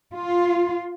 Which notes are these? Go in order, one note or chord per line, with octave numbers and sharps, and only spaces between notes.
F4